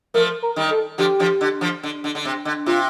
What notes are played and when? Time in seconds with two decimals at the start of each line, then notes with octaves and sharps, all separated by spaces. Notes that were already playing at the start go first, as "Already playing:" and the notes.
0.14 F3 A3 A#4
0.42 A#4
0.56 D#3 G3
0.71 A4
0.98 D3 F3 G4
1.19 D3 F3
1.41 D3
1.61 D3 F3
1.83 D3
2.04 D3
2.15 D3
2.25 C3
2.45 D3
2.66 C3 F4